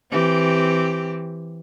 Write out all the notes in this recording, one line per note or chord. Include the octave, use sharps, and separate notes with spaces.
E3 C4 G4